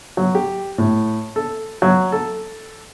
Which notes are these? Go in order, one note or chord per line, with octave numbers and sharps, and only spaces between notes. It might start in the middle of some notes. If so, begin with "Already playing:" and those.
F#3
G4
A2
A4
F#3
A4